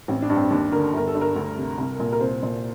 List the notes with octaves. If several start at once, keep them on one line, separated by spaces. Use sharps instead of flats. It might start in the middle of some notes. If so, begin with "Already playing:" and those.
A1 C4
D4
G2
C4
D#2 D4
D3 A#4
G1 A#4
A4
G2
A#4
D2
C3
C2
A#2
A#4
C2 C5
A#2